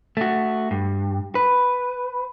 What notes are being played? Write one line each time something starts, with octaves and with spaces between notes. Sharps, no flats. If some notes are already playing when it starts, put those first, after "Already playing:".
A3 F#4
G2
B4